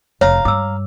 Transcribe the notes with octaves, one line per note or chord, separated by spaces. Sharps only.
F1 C#5 F5 A#5
G2 D6 E6